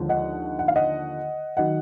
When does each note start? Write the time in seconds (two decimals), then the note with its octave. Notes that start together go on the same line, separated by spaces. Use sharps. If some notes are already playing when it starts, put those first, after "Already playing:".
Already playing: D#2 D3 F3 G#3
0.09 D#5 F#5
0.59 F#5
0.68 F5
0.76 D#5 F#5
1.57 D#3 F#3 D#5 F#5